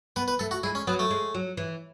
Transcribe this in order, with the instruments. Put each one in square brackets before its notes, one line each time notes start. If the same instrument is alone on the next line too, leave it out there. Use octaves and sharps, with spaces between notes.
[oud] B3 [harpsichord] B4
[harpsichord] B4
[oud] A3 [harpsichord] A4
[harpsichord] F#4
[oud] G#3 [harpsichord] E4
[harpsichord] C#4
[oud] F#3 [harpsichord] B3
[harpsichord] A3
[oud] G#3
F#3
E3